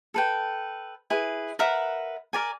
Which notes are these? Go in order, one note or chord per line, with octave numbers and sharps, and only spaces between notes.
A4 B4 G5
E4 G#4 B4
A#4 B4 E5 F#5
A#4 D5 G#5